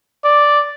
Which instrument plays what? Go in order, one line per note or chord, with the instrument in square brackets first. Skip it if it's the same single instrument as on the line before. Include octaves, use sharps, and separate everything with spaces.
[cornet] D5